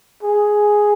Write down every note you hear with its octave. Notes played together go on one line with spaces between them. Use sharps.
G#4